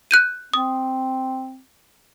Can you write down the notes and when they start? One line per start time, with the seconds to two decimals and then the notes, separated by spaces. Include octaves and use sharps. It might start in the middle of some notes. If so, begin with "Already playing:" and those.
0.11 F#6 G6 D#7
0.54 C4 D#6